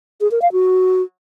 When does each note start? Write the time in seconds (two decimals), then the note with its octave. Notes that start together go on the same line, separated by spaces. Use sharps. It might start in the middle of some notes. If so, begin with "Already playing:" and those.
0.21 G#4
0.31 A#4
0.42 F5
0.52 F#4